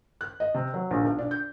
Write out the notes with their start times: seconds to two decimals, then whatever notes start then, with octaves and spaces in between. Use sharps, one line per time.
0.21 F#6
0.40 D#5
0.54 C3
0.74 F#3
0.91 A#1
1.04 B1
1.18 D4
1.31 G6